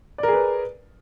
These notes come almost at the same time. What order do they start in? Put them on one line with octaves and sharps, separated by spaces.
D5 A#4 G#4 B4